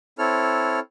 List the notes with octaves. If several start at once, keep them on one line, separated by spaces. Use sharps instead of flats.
C4 E4 A4 C#5 F6